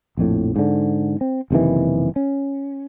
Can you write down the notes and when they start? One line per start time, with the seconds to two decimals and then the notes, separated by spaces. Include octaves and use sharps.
0.17 A#1 F2 A2
0.56 G#2 D3
1.21 C4
1.51 F#1 C3 D#3 E3
2.16 C#4